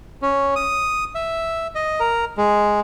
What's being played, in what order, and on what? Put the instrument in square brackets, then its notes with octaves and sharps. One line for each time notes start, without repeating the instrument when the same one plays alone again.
[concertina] C#4
D#6
E5
D#5
A#4
G#3